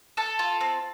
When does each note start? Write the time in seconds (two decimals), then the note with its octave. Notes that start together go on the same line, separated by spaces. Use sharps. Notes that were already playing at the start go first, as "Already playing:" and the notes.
0.17 A4 A5
0.39 F4
0.61 C4